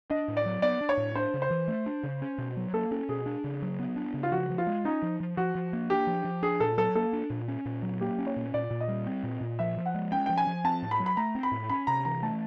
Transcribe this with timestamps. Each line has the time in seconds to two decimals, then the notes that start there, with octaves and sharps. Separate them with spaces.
0.10 D4 D#5
0.28 A2
0.37 D5
0.46 F#3
0.62 B3 D5
0.81 D4
0.89 C#5
0.98 A2
1.15 D4 C5
1.34 C#3
1.42 C5
1.51 E3
1.68 A3
1.86 D4
2.03 C#3
2.22 C#4
2.38 B2
2.57 F#3
2.73 A#3 A4
2.91 C#4 A4
3.09 B2 G#4
3.26 D4
3.44 C#3
3.62 F#3
3.79 B3
3.96 D4
4.14 C#3
4.23 F4
4.32 F3 F#4
4.50 F3
4.58 F4
4.67 G#3
4.85 C#4 D#4
5.02 F3
5.20 F3
5.37 F3 F#4
5.55 F3
5.73 A#3
5.90 D4 G4
6.07 F3
6.25 F3
6.42 D4 G#4
6.60 A#2 A4
6.78 F#3 A4
6.95 A#3 A4
7.13 D4
7.30 A#2
7.48 C#4
7.66 A#2
7.83 F#3
8.01 A#3 G4
8.19 C#4
8.27 C#5
8.36 A#2
8.54 A#2 D5
8.71 A#2
8.81 D#5
8.88 G3
9.07 C4
9.24 A#2
9.41 A#2
9.59 F3 E5
9.77 F3
9.86 F#5
9.94 G#3
10.12 C#4 G5
10.26 F3 G5
10.38 G#5
10.47 F3
10.64 C4 A5
10.83 A2
10.91 B5
11.00 F#3
11.06 B5
11.17 A3 A#5
11.35 C4
11.43 B5
11.52 A2
11.70 C#4 B5
11.87 C3 A#5
12.05 E3 A#5
12.22 A3 A5